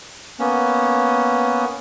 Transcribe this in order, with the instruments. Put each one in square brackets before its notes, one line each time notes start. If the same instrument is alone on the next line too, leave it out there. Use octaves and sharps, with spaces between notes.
[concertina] A#3 B3 C#4